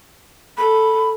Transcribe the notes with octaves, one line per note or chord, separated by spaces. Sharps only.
A4 B5